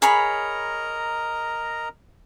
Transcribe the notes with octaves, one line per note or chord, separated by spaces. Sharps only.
G#4 A#4 C#5 D#5 A#5 B5